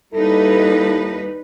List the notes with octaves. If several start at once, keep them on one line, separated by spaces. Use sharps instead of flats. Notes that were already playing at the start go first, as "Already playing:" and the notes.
D#2 G3 D#4 E4 A4 B4